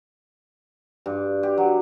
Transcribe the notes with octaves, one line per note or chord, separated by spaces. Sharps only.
G2
G4
F#3